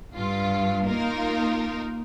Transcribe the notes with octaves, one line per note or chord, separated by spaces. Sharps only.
G2 F4
A#3 D#4 F4 A#4